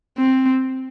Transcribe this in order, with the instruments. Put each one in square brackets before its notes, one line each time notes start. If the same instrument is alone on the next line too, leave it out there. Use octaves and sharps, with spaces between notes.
[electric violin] C4